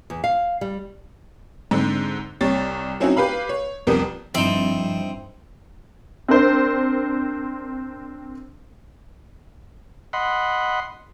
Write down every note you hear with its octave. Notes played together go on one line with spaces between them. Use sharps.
E2
F5
G3
G#2 D3 C4
C2 C3 C#5 A6
F#3 C4 C#4 D#4 E4 F#4
G4 B4 F5 B5
C#5
C2 F2 B3 G4 A#4
G2 F3 C4 D#4 E4
C4 D4 A#4 C5
D#5 F#5 B5 C6